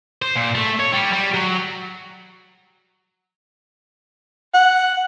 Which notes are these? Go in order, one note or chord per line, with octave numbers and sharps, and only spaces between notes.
C5
A#2
A3
C#5
G3
G3
F#3
F#5